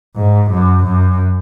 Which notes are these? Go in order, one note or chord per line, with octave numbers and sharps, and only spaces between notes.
G#2
F#2
F#2